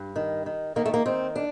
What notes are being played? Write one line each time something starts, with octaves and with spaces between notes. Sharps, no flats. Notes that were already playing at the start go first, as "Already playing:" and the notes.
Already playing: G2
D#3
D#3
D#3 A#3
A3
A#3
D#3 C4
D4